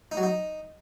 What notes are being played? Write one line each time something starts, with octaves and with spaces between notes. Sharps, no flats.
D#4
F#3
D#4